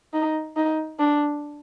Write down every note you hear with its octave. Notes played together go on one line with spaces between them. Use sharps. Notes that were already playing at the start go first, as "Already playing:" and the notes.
D#4
D#4
D4